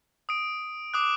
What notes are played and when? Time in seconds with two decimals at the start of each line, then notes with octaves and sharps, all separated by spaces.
0.29 D#6 D7
0.94 D6 D#6 F#6